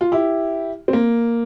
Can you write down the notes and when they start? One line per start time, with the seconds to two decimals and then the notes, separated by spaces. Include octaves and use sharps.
0.01 F4
0.12 E4 G4
0.88 C4
0.93 A#3